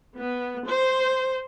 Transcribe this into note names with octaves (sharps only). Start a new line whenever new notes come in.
B3
C5